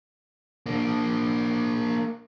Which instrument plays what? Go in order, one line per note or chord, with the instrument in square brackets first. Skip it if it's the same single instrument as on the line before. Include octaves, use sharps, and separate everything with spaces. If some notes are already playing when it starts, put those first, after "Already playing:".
[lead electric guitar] A#3 D4